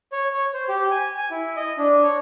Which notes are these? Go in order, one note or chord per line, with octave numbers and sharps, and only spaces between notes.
C#5
C#5
C5
G4
G#5
G#5
E4
D#5
D4
C#5